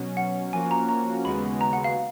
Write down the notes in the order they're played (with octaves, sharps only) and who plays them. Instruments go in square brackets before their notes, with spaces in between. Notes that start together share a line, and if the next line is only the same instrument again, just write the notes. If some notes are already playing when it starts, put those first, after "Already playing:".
Already playing: [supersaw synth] B2 F#3 C#4
[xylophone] F#5
[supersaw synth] F3 A#3 C#4 F#4 [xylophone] G#5
[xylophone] A#5
A#5
[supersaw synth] D#2 C#3 G#3 B3 F#4 [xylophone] B5
[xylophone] A#5
F#5
F5